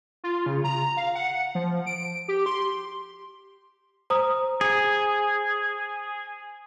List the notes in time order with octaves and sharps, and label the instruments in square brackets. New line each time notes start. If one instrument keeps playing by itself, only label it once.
[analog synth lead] F4
C#3
A#5
F5
F#5
F3
D7
G4
C6
[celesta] C5 A#5 D#6
[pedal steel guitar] G#4